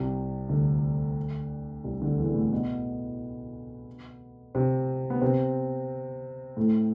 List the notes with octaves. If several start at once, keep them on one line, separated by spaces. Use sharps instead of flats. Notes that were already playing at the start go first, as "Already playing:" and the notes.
Already playing: C2 C3
D2 D3
C2 C3
D2 D3
E2 E3
A2 A3
B2 B3
C3 C4
B3
C3 C4
A2 A3